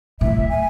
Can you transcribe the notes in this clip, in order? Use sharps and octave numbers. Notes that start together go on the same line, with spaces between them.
A2 E5
G#5